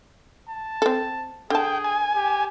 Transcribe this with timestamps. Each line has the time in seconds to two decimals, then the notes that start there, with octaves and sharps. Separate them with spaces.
0.49 A5
0.82 C4 A4
1.50 D3 G#4 G5 A5
1.84 G#5
2.15 G4